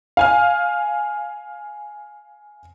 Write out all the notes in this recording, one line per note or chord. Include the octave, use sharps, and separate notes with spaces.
F5 G#5 F6